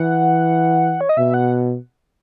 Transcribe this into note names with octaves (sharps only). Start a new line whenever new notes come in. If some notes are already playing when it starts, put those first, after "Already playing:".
Already playing: E3 F#5
C#5
D#5
B2 E5
F#5